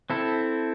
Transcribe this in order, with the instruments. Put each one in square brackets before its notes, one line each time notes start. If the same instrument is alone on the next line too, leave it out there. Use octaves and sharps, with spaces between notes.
[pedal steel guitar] C4 E4 A4